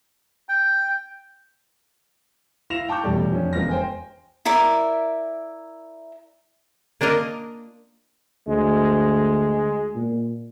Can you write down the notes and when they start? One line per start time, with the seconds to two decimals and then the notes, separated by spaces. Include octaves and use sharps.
0.49 G5
2.70 E4 F5 A#6 E7 F7
2.88 G5 A5 C#6 D6 G6
3.03 A1 E2 B2 G3 A3
3.31 F2 F3 C#4 D4
3.53 E1 B3 F5 F6 A#6
3.69 C5 G5 G#5
4.45 E4 A#4 D5 E5
7.01 A#3 D4 F4 A#4 D#5
8.48 D2 G#3
9.95 A#2